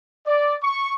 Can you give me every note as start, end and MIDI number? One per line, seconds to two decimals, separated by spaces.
0.25 0.55 74
0.61 0.94 85